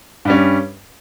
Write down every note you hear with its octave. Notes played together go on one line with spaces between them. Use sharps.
G2 G3 C#4